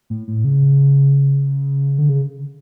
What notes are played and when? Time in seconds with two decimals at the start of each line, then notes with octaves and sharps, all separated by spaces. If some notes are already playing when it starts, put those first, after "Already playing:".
0.10 A2
0.28 A2
0.44 C#3
1.99 D3
2.09 C#3